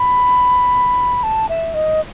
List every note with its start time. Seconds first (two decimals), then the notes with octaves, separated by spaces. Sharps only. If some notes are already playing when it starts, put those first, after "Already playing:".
Already playing: B5
1.23 A5
1.49 E5
1.74 D#5